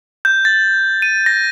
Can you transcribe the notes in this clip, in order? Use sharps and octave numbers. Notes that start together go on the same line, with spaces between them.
G6
A6
D#7
A#6